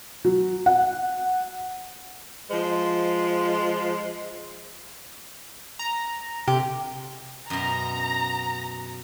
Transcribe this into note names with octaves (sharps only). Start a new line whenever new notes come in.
F#3
F#5
F3 G#3 F4 C5
A#5
C3 G4
F#2 B2 A#5